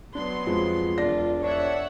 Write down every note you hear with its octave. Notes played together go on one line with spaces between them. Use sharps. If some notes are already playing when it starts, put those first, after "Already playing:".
F#3 B3 D4 C6
F2 F3 G#3
E1 D4 F4 A#6
D4 C#5 E5 F#5